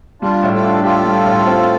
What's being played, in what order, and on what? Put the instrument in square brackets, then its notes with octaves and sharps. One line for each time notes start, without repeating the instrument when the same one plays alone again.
[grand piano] G3 [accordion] D4 F4
[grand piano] A2
[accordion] F4 A4
[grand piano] D4
[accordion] F4 A4 [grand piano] G4
[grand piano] G3
A2
C4